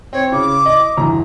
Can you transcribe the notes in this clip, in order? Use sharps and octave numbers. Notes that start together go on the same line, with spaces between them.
C4 C#5
C#3 D6
D#5
G1 E2 A#5